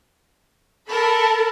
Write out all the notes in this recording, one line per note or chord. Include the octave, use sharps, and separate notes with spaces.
A4 A#4 A5 B5